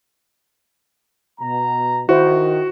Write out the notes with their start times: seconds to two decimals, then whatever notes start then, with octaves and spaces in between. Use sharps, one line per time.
1.40 B2 A#5
2.09 D#3 E4 F#4 C5